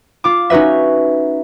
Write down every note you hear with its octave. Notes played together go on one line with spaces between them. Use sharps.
F4 D6
C#4 D#4 F#4 B4 E5